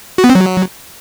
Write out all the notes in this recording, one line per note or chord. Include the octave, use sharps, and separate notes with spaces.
F#4
B3
C4
F#3